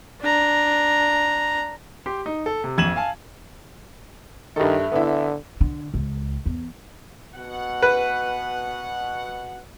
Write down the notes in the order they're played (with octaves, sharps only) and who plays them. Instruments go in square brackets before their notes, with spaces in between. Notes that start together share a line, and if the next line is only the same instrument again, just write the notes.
[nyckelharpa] D4 A#5
[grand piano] G4 C6
D#4
A4
C3
A#1 F2 G#6 D#7 E7 F#7
F5 G#5 A5
[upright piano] G2 A4 [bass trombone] D#3 [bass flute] E5
[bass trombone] D3 [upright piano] B3 E4
[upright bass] D3
C#2
E2
[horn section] B2 F#5
[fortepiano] B4